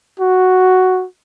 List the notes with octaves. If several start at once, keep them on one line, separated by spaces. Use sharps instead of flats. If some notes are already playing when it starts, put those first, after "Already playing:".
F#4